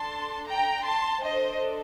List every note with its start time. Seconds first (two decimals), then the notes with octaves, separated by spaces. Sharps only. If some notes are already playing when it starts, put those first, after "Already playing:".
Already playing: D4 A4 A5 C6
0.49 G5 A#5
0.86 A5 C6
1.24 D4 A4 C5 D#5